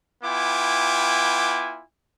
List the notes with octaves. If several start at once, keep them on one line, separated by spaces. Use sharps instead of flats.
B3 E4 F4 G5 G#5 D6